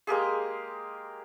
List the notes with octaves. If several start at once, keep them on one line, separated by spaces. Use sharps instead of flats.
G#3 A#3 G4 G#4